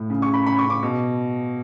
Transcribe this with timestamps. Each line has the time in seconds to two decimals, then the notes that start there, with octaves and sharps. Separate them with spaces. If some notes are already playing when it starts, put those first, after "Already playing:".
Already playing: A2
0.10 C#3
0.22 C#6
0.28 C#3
0.34 B5
0.46 C#3 B5
0.58 C#6
0.65 C#3
0.70 D6
0.83 B2